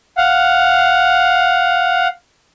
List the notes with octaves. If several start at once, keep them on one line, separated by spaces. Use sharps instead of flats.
F5 F#5